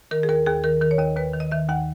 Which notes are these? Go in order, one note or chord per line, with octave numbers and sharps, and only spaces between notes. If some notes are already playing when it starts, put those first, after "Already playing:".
D#3 A#4
G#4
D#2 A#4
D#2 G#4
D#3 A#4
D#3 A#4
C#5
D#2 D#5
D#2 B4
D#3
D#5
D#3 E5
D#2 F#5